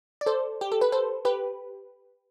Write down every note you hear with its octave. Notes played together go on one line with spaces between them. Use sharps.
D5
A4 C5
G4
A4
B4
A4 C5
G4 B4